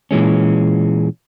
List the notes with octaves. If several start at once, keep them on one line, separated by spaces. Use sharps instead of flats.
A#2 E3 G#3 C#4